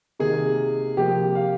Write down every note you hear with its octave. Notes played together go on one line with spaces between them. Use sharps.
C3 D#3 A#3 G#4
C3 F3 A#3 G4
F5